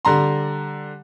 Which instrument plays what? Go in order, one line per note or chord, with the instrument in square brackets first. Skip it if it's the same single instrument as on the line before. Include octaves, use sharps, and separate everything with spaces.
[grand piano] D3 G3 A#5 C6